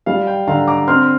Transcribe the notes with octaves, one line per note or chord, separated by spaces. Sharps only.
G3 F5
G5
D3 F5 A#5
A#5 D6
C4 C6 F6